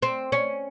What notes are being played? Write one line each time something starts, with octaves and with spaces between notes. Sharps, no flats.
C4
C#4